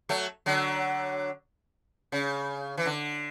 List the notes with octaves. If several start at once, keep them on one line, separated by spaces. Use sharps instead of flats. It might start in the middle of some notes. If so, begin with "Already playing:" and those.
F#3 A3
D3 F#3
C#3
E3
D3